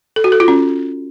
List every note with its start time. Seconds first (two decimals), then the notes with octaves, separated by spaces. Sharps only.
0.16 A4
0.24 F#4
0.32 A4
0.40 F4
0.48 C#4